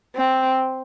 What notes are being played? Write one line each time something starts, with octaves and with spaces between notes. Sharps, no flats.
C4